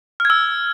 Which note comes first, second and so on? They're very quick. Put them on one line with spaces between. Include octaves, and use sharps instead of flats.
F6 G#6 E6